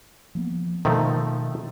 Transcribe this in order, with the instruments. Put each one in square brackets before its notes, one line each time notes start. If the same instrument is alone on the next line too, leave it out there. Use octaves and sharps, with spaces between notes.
[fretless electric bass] F3 A#3 B3
[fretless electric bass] B2 [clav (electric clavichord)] D#3 F3 A3